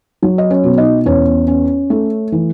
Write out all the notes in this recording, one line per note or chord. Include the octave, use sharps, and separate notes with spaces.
F#3
D#5
C#4 C#5
B2
D#4 D#5
E2 C#4 C#5
C#4
A3
E3